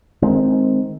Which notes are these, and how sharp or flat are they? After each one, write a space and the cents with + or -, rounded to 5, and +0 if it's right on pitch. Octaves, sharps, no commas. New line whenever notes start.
D#3 +0 G#3 +20 C4 +0